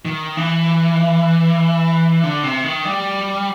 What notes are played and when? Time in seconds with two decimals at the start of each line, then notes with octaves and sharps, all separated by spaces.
0.05 D#3
0.37 E3
2.24 D3
2.43 C3
2.64 D#3
2.85 G3